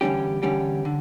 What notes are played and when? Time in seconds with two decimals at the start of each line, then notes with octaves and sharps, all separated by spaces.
0.01 E2 D3 G3 C#4 G4
0.43 E2 D3 G3 C#4 G4
0.85 D3